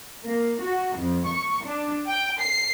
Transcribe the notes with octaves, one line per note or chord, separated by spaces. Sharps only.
A#3
F#4
F2
C#6
D4
G5
C7